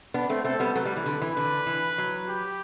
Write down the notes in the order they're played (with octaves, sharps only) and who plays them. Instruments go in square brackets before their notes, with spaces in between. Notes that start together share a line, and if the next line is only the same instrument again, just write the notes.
[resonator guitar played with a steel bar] B3 D4
A3 C4
[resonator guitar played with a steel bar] A3 C4 [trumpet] A4
[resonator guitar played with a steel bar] G3 B3
[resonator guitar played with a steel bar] F#3 A3 [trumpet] B4
[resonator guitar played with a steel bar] G3
E3
D3
E3
[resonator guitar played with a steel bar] D3 [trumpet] B4
[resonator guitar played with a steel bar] E3
F#3
[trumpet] G4